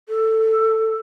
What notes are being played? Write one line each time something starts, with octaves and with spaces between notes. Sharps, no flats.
A4